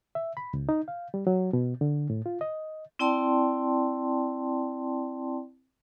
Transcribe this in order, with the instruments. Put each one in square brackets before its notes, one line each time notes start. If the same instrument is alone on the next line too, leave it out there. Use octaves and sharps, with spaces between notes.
[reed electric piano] E5
B5
C#2
D#4
F5
G3
F#3
B2
D3
A2
F4
D#5
[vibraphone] C4 E4 D5 G5 A5 C6